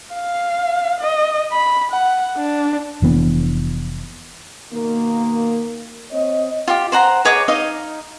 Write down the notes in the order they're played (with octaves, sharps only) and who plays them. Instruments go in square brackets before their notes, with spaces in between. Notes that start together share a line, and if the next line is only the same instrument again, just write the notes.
[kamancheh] F5
D#5
B5
F#5
D4
[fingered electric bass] F1 E3 B3 D4
[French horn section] B2 D#3 A#3
C4 C#5 D#5
[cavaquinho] F4 G4
C5 F#5 A#5
G#4 C#5 D#5 D6
D#4 D#5 F5